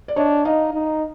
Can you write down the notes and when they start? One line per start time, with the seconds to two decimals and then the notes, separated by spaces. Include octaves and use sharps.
0.08 D5
0.16 D4 C#5 D#5
0.45 D#4 D#5 F5
0.74 D#4